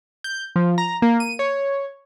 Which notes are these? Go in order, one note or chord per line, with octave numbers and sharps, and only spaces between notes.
G6
F3
A#5
A#3
D#7
C#5